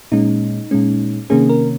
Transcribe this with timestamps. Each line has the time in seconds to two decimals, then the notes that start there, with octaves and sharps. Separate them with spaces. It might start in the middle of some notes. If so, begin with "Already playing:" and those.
0.12 A#2 G#3 C#4 D#4
0.71 A#2 G#3 C#4
1.30 C3 D#3 A#3 C#4 G#4
1.50 A#4